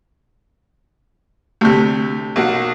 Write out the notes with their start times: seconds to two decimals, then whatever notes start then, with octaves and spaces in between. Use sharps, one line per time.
1.61 D2 C3
2.36 B1 A#3 F#4